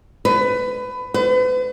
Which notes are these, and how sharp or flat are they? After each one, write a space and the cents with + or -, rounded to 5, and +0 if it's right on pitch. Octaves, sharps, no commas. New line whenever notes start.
B4 +20
B4 +40